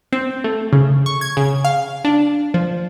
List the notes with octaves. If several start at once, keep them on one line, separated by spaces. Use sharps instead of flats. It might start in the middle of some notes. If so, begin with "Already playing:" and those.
C4
A3
C#3
C#6
G#6
C#3
F5
D4
F3